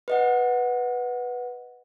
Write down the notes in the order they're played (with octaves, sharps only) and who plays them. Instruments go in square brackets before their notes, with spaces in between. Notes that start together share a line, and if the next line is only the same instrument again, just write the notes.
[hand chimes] B4 D#5 F#5